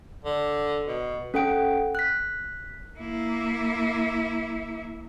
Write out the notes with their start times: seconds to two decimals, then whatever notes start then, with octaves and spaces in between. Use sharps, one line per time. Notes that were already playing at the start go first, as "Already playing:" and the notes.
0.25 D3
0.87 B2
1.34 C#4 A4 F#5 G5 D7
1.95 F#6 B6
2.98 A#3 E4